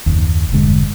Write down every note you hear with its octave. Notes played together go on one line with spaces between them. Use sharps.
F#1 D#2
E1 G2 D3 G#3